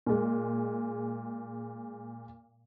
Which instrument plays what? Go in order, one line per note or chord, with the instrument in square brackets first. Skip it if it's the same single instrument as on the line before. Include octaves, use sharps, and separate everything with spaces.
[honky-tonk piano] A#2 G#3